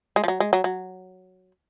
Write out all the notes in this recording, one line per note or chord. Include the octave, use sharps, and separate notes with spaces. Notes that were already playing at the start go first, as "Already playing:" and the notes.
G#3
F3
F#3
G#3
F#3
F#3